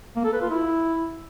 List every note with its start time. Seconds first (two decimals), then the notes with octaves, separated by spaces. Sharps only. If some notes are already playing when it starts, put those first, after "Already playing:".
0.16 A#3
0.24 A4
0.33 B4
0.41 F4
0.50 E4